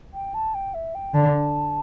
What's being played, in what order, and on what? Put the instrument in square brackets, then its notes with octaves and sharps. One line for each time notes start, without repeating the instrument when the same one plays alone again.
[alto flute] G5
A5
G5
E5
G5
[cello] D3 [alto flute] A5